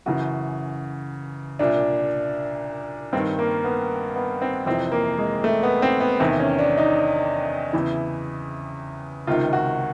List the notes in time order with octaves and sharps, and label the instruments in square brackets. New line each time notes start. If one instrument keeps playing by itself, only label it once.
[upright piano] F#2 C#3 E3 F#4
C2 A#2 D4
G2 D#3 C4
A#3
B3
B3
C4
F2 C3 E3 C4
A#3
G#3
A3
B3
C4
B3
E2 C3 D#3 C4
C#4
D4
D#4
E2 C#3 E3 E4
C#2 C3 D#3 F4
F#4